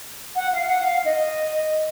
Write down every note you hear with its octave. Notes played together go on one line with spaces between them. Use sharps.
F#5
F5
F#5
F5
D#5